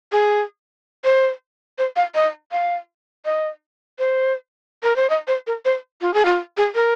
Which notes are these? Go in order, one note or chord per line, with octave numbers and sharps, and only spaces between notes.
G#4
C5
C5
F5
D#5
F5
D#5
C5
A#4
C5
D#5
C5
A#4
C5
F4
G#4
F4
G#4
A#4